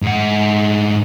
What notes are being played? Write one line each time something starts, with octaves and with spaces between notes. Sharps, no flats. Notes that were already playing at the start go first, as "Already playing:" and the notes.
G#2 F#5